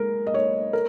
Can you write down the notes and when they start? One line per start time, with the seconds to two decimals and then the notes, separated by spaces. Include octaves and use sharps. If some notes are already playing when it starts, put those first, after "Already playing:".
Already playing: G#3 A#4
0.27 D#5
0.34 C#5
0.73 A#4